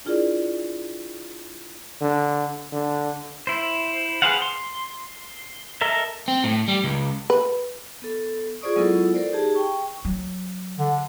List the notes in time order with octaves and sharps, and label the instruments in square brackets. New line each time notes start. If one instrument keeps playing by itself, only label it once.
[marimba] D4 E4 F4 G#4 A#4 D5
[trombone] D3
D3
[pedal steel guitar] E4 C5
G#4 B4 C5 F5 F#5
C6
A4 A#4 D#5 E5
[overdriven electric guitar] C4
A2
G3
C#2
[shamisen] B4
[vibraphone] B3 A4
F4 G#4 C5 D5 C#6 D#6
F#3 G#3 B3 E4 F4 A4
A4 A#4 C5 D5
D#4 G4 G#4 A5
G5 C#6
[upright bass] F#3
[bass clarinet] D3